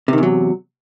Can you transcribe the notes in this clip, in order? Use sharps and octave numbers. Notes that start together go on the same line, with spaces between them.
E2 C3 D#3 F#3